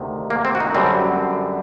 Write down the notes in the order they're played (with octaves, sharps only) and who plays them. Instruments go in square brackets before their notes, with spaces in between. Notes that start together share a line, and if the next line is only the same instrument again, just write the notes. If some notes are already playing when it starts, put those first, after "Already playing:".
Already playing: [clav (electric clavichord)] D2 C3 D#3
A#3
C4
F#4
D#4
F#2 D3 G3 C4